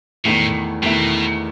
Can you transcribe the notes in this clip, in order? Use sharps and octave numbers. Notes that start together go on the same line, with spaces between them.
E2 A2 D#3 A3 E4
E2 B2 D#3 A3 E4